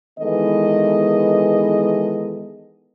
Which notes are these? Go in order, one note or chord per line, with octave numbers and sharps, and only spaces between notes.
D#3 E3 G#3 B3 A4 D#5